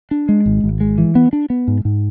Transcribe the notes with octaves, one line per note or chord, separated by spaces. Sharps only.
D4
G#3
G#1
G#1
G#3
E3
B3
D4
B3
G#2
G#2